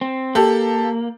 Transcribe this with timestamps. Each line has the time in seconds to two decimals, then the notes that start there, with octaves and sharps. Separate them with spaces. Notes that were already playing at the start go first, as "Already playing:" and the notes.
0.01 C4
0.35 A#3 G4 A4